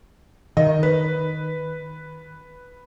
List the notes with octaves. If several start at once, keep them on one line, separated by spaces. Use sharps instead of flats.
D#3 D#5
B4